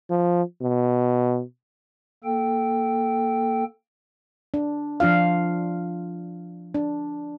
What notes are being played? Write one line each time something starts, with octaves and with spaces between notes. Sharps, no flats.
F3
B2
A#3 A4 G5
D4
F3 D4 F4 F5
D4